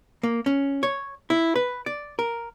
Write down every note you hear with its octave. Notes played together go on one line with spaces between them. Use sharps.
A#3
C#4
C#5
E4
B4
D5
A#4